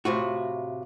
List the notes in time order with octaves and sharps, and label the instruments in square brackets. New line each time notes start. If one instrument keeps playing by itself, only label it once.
[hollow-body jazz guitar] A2 C3 F4 F#4